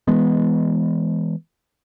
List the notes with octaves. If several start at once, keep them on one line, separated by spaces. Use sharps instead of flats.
E3 G#3 B3